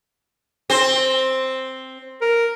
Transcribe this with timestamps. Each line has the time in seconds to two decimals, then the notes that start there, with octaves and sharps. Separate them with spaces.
0.70 C4 C5
2.22 A#4